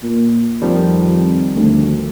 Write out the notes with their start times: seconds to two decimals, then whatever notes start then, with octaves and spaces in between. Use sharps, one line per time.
0.03 A#2
0.62 F2 D#3 F3 G3
1.56 D2